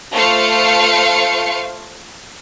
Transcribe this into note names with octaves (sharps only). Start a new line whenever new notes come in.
A3 F4 C5 F5 C#7